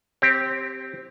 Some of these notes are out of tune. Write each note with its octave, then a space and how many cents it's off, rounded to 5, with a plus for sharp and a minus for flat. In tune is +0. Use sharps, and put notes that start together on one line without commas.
C4 +0 G4 +0 C5 +45